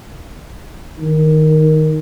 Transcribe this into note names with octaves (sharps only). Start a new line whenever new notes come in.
D#3